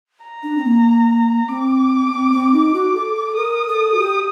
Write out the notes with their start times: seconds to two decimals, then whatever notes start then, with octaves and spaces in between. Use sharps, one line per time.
0.23 A#5
0.43 D4
0.58 C4
0.64 A#3
1.48 C4 D6
2.11 C4
2.32 C4
2.53 D#4
2.74 F#4
2.94 A4
3.15 A4
3.36 A#4 D#6
3.68 A4
3.94 F#4
3.99 G4